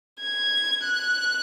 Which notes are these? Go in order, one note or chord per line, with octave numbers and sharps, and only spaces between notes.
G#6
F#6